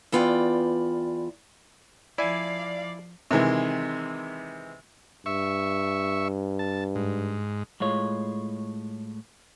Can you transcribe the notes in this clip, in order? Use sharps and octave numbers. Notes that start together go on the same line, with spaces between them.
E2 B3 F4 D5 G5
F3 E4 D5 F5 G#5
C3 D#3 E3 G#3
G2 E5 C#6
A5
G#2
A2 G#3 F4 C#5